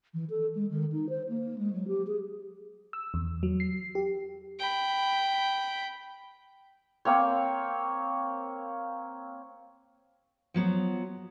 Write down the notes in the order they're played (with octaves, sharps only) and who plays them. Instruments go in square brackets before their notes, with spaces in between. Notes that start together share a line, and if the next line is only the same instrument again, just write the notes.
[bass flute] E3
A4
G#3
D#3
D#4
C5
A#3
G#3
F#3
G4
G#4
[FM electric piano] E6
E2
F#3
C7
G4
[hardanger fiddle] G5 B5
[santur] A#3 C4 C#5
[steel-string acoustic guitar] F3 F#3 B3